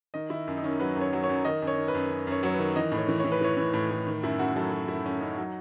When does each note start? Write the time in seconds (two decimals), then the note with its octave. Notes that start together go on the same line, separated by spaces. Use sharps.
0.14 D#3 D#5
0.30 D#3 E4
0.47 F#2
0.57 D#4
0.64 D#3 C#4
0.80 F#3 B4
0.96 F#2
1.01 C#5
1.13 F#3
1.24 C#5
1.29 F#2
1.45 D#3 D#5
1.62 F#2
1.67 C#5
1.78 D#3
1.88 B4
1.94 F#2
2.11 F#2
2.27 F#2 C#5
2.43 F#3 C#5
2.54 B4
2.59 D#3
2.76 E3 D#5
2.92 A2
2.98 C#5
3.09 E3
3.20 E3 C#5
3.32 B4
3.41 E3 C#5
3.57 E3
3.74 A2
3.91 A2
4.07 D#3
4.23 F#2 E4
4.39 F#2 F#4
4.56 F#3 A4
4.73 F#3
4.88 F#2 E4
5.05 F#2 C#4
5.21 F#2 D#4
5.38 F#3 D#4